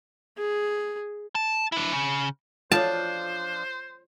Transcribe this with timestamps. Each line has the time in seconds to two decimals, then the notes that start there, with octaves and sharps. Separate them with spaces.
0.38 G#4
1.35 A5
1.72 D4 E4
1.92 C#3
2.72 F3 D4 F4 A4 C5 C#5 A5